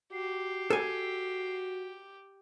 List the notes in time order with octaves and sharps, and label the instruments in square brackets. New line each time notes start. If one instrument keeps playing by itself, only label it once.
[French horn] F#4 [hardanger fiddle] G4 [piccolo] C7
[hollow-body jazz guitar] A4 G#5